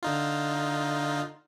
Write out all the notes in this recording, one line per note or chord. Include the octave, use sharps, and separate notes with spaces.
D3 D#4 F4